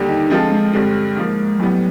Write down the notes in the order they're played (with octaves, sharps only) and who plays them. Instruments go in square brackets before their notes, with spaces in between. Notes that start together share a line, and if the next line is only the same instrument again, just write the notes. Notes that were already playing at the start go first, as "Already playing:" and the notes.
Already playing: [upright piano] D#2 D3 G3
[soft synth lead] D#4
[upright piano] F3 G#3 C4 F4 A4 [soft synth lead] D4
[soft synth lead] G#3
[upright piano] G2 D3 G3 C4 [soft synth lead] G#3
[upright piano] G#2 F3 A#3
[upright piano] A2 E3 G3 B3 [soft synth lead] F#3